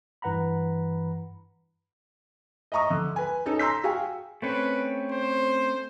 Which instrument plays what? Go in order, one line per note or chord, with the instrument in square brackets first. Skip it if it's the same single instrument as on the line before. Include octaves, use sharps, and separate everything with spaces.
[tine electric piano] G2 E3 B4 F#5 A#5 B5
[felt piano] D#5 E5 A#5 C#6 D#6
D3
B4 G#5
C#4 D#4 A4
A#5 C6 E6 G6 B6
F#4 G#4 F5 G5 G#5
[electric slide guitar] A3 C4 C#4 [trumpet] B4
[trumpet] C5